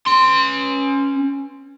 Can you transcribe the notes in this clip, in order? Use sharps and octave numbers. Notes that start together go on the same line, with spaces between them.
C#4 C6